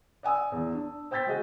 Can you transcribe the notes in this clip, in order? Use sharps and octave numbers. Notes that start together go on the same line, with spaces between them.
D5 F#5 G#5 D#6 E6
E2
D4
C5 G5 E6 G6 A6 B6
G#3 F#4 G#4 D#5 F#5